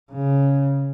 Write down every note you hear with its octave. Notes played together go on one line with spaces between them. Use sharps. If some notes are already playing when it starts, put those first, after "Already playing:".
C#3